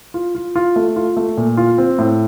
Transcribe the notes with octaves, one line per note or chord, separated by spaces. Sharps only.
F4
F4
F4
A3
F4
A3
A#2
F4
C4
A2